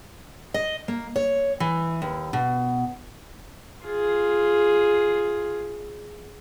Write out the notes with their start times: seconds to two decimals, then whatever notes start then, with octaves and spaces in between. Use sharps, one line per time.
0.54 D#5
0.88 A#3
1.16 C#5
1.60 E3
2.02 D#2
2.33 B2
3.85 F4 G#4